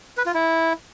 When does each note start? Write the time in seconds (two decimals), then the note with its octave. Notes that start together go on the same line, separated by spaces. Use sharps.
0.17 B4
0.26 F4
0.34 E4